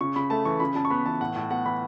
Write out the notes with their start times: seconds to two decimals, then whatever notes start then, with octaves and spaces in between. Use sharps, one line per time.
0.01 C#3 C#6
0.16 C#3 B5
0.30 A3 A5
0.45 E3 C#6
0.60 C#3 B5
0.75 C#3 A5
0.85 C#6
0.90 B3 B5
1.06 E3 A5
1.20 A2 F#5
1.36 A2
1.50 B3 F#5
1.65 E3 B5